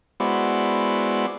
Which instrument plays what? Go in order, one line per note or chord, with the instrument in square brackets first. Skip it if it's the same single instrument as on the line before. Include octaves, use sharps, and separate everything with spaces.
[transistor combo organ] G#3 B3 E4 F#4 C5 D5